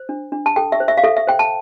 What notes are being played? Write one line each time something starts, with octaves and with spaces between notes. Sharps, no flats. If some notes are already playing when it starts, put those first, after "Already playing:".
Already playing: C5
D4
D4
A5
A4 G5
E5
C5
E5
F5
A4 E5
E5
C5 G5
A5